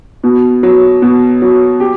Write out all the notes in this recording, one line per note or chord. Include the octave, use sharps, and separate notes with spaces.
B2
F#3
B2
F#3
G4